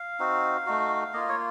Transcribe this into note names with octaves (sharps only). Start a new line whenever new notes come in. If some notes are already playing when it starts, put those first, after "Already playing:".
Already playing: F5
C4 D#4 F#4
A3 D#4 F#4
A#3 F4 D#5
C#5